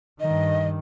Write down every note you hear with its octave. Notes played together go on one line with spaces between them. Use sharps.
G2 D#3 D#5